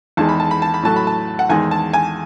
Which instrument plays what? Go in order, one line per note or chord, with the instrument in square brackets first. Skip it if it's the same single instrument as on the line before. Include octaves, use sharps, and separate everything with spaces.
[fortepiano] E2 D#3 G#3 A5
B5
A5
B5
A5
B5
A2 F#3 A3 A5
B5
A5
F#5
E2 D#3 G#3 G#5
A5
G#5